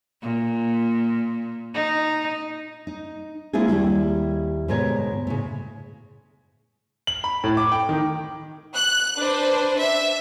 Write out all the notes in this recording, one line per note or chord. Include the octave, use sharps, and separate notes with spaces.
A#2
D#4
D#4
G#3 A#3 C4 E4 F4 G#4
D#2 G3 E4 G4
D2 G#2 B2 A#4 C#5
A2 C#3
F#7
B5
A2
D6
G5
D#3
F#6
D4 B4 C5
E5